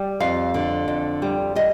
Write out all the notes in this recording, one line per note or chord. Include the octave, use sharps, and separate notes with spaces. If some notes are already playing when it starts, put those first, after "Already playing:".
Already playing: G3
F2 F5
D3
F2
G3
G3 D#5